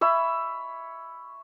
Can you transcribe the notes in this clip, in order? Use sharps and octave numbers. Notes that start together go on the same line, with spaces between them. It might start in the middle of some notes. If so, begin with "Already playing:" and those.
C#5 E5 B5